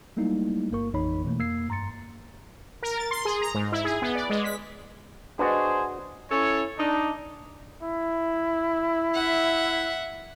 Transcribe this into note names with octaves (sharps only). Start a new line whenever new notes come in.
F#3 G3 A3 A#3 D#4 E4
G1 G2 A#3 A#4 C#6
A1 F2 E3 D#4 C#5 B5
B2 E3 A3 A#3
F2 A#3 E6 G#6 C7
G2 A#5 C6 A6 C#7
A#4
A6
C6
G#4
A#5
G#2
E4
G#4
B3
D5
G#3
B6
D4 F#4 G#4 B4 C5 D#5
C#4 E4 A4 C#5
D4 D#4
E4
E5 F#5